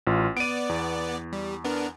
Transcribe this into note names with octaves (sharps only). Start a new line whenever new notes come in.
A1 F4
B3 D5 D7 D#7
E2
G3
B3 D4 A#4